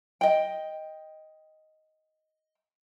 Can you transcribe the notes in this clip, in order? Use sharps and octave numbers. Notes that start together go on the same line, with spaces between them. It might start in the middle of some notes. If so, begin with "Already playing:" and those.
D#5 G5